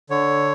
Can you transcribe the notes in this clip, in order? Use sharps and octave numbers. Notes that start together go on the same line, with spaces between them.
D3 C#5